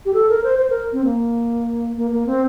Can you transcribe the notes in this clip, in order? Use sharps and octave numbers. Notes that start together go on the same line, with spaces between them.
G4
A4
A#4
C5
C5
A#4
C4
A#3
A#3
A#3
C4